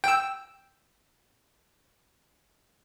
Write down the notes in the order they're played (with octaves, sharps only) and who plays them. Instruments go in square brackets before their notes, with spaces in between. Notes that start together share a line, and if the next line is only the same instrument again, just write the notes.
[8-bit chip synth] G5 E6